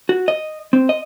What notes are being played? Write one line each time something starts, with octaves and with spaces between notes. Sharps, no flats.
F#4
D#5
C4
D#5